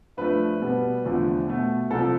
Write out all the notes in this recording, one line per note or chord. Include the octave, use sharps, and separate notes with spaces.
G2 F3 A3 B4
B2 G3 B3
E2 D3 F3 A3
B2 A3
C2 C3 F3 A4